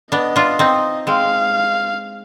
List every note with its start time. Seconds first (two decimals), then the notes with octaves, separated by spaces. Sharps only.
0.12 B3 D4 D#5
0.36 D4 F4
0.59 C4 D#4
1.07 G#3 C4 F5